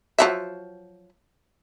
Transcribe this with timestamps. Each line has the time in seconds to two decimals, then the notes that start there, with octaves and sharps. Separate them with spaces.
0.18 F3 F#3 E5